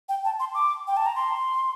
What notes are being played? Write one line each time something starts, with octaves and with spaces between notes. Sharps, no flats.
G5
A5
C6
D6
G5
A5
A#5
C6